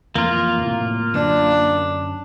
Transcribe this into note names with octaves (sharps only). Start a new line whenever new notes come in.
F2 E3 A#3 F4
A2 C3
F#2 D3 F#3 D4